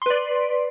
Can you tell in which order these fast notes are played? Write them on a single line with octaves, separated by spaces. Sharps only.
C6 B4 D5